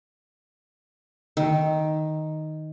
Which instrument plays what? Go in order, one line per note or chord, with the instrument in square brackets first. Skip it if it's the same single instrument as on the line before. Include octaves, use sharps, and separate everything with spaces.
[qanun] D#3